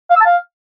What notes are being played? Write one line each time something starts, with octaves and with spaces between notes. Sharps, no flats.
F5
E6
A5
F5